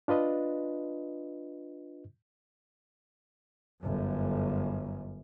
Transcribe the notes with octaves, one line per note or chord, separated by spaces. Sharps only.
D4 F4 B4 D#5
G1 F#2